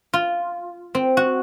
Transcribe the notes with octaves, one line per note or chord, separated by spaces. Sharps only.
F4
C4
F#4